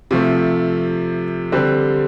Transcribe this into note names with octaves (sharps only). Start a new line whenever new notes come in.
C3 F3 A3
D3 G3 C4